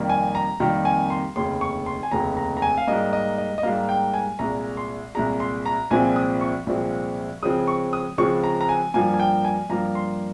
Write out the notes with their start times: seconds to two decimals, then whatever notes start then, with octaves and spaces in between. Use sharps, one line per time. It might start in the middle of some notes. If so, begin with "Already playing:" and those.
Already playing: F2 C3 D#3 G3 A#3
0.09 G#5
0.35 A#5
0.60 F2 C3 D#3 G3 A#3
0.85 G#5
1.10 C6
1.36 F1 D#2 C#3 C6
1.61 C#6
1.86 C6
2.03 G#5
2.11 F1 D#2 C#3 A#5
2.37 A#5
2.57 A#5
2.62 G#5
2.78 F5
2.87 G#2 G3 A#3 D#5
3.13 D#5
3.38 D#5
3.58 D#5
3.63 G#2 G3 A#3 F5
3.89 G5
4.14 G#5
4.39 C2 A#2 G#3 A#5
4.77 C6
5.15 C2 A#2 G#3 A#5
5.40 C6
5.66 A#5
5.90 C2 A#2 F3 G#3 C4 G#5
6.16 D#6
6.41 C#6
6.66 C2 A#2 F3 G#3 C4
7.42 C#2 C#3 F3 G#3 C4 D#6
7.68 C#6
7.93 D#6
8.18 C#2 C#3 F3 G#3 C4 C#6
8.44 A#5
8.61 A#5
8.69 G#5
8.94 G2 F3 A#3 G#5
9.14 G#5
9.20 G5
9.45 G#5
9.70 G2 F3 A#3 A#5
9.95 C6